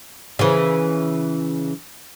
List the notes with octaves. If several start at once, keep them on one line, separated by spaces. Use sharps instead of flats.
C#3 E3